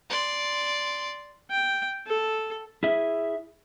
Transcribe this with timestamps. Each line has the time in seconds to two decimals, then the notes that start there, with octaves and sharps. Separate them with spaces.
0.10 D5 C6
1.51 G5
2.07 A4
2.83 E4 G#4 E5